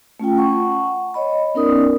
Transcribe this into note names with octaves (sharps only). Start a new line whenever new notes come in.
A3 C#4 F4 G5
F#5 A5 C#6
C#5 D#5 B5
B3 C#4 D#4 A#4 D5 D#6